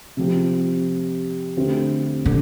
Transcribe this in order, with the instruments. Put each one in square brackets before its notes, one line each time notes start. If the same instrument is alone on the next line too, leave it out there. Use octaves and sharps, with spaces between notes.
[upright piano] C3 F3 C4 G4
D3 A3 C4 G4
[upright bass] D3